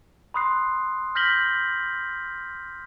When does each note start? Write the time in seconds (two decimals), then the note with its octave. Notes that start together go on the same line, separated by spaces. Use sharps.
0.34 B5 C6 D#6 F#6 C7
1.15 F6 G6 A#6 B6 F#7 G7